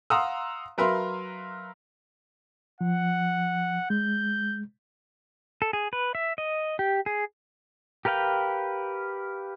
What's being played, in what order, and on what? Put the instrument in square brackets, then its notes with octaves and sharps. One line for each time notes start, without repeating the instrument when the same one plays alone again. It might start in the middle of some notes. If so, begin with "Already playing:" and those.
[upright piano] F5 F#5 A#5 C6 D#6 E6
F#3 A#4 B4 E5 F5 C6
[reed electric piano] F3 [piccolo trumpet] F#5
[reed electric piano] G#3 [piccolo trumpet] G6
[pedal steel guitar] A4
G#4
B4
E5
D#5
G4
G#4
G4 A#4 B4 F5 G5